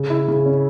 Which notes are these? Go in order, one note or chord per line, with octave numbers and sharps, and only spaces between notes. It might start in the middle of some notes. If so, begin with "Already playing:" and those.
Already playing: C#3
E4
C#3
C#4